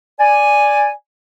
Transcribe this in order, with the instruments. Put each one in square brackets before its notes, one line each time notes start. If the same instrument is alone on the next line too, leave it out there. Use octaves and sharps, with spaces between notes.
[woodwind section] D5 G#5